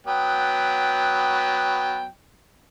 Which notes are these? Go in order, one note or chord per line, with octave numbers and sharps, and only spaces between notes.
F#3 B3 G5